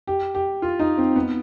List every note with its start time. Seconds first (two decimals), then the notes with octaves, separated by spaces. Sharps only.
0.07 G4
0.35 G4
0.62 F4
0.79 D#4
0.98 C4
1.16 B3